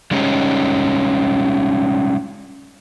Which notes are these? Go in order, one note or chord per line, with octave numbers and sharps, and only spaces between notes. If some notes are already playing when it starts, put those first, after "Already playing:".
G3 G#3 C#4 D#4